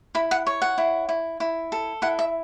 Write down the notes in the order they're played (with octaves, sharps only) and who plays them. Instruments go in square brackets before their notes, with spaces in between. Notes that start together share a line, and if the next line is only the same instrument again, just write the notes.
[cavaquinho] E4 B5
F#5
C#5
F#5
E4
E4
E4
A4
E4 F#5
E5